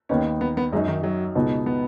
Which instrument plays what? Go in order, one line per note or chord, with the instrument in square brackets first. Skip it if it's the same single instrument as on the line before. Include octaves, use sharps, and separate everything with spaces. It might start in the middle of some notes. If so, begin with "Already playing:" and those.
[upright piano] D#2 D#3 B3 D#4 [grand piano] C#4
[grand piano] B3
B3
[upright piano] F#2 F#3 D#4 [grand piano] G#3
[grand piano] D#3
F#3
[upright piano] C#2 B2 B3 D#4
[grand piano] B3